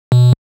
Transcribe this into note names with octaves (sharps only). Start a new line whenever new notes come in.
B2